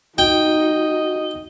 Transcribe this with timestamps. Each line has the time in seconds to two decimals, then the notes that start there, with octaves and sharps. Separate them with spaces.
0.18 D#4 F#4 D#5 G5